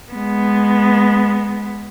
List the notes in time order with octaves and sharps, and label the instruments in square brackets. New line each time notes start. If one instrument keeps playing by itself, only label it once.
[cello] G#3 B3